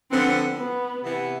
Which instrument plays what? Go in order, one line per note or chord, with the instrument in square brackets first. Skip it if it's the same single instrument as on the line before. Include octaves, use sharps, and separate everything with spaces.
[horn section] D3 F3 B3 [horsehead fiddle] C4
[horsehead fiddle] B3
[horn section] C3 E3 B3